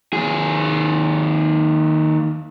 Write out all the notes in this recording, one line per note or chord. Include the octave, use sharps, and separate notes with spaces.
D#2 G#4